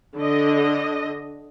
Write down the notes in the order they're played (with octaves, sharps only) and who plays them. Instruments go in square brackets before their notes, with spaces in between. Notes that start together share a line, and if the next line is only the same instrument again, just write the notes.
[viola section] D3 D#5